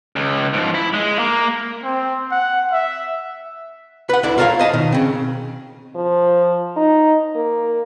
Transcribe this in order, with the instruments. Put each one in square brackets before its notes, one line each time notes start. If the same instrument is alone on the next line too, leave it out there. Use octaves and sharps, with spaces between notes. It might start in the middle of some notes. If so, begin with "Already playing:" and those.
[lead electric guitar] C#2
G#2 F3
E4
G#3
A#3
[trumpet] C4
F#5
E5
[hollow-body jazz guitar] B4 F#5
D2 D3 E4 D5
F4 A4 A#4 C5 C#5 F5
C5 D#5 A5
B2 D#3
C#3 C4
[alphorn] F3
D#4
A#3